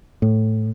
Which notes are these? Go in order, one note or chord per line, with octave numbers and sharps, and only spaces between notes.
A2